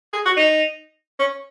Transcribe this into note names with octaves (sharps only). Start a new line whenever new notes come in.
G#4
F#4
D#4
C#4